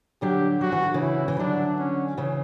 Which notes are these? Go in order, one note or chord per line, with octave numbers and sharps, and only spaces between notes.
D3 F#3 G4
F#3 F#4
E3
D3
C#3 E3
E4
E3
D3 F#3 D4
C#4
C#3 E3